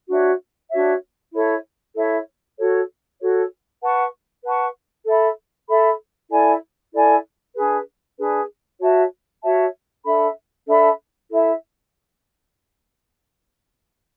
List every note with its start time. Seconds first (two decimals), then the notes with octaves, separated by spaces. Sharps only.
0.08 D4 F#4 C#5 E5
0.71 D4 F#4 C#5 E5
1.32 E4 A4 C#5 E5
1.96 E4 A4 C#5 E5
2.57 F#4 A4 C#5
3.20 F#4 A4 C#5
3.82 B4 F#5 A5 C#6
4.44 B4 F#5 A5 C#6
5.06 A4 E5 B5
5.68 A4 E5 B5
6.31 E4 A4 D5 G#5
6.93 E4 A4 D5 G#5
7.56 D4 G#4 B4
8.18 D4 G#4 B4
8.80 F#4 C#5 E5 A5
9.43 F#4 C#5 E5 A5
10.04 D4 A4 E5 B5
10.67 D4 A4 E5 B5
11.30 E4 A4 E5